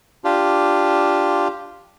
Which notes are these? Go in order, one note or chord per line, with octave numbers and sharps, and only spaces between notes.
D4 F4 G4